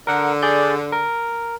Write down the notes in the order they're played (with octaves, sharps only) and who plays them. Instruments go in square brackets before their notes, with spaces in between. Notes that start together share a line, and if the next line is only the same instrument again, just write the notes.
[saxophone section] D3 [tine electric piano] A#4 F#5
[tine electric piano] G#4 D5 G6
A#4